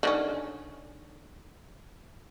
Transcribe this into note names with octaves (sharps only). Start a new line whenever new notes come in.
D3 D#3 C#4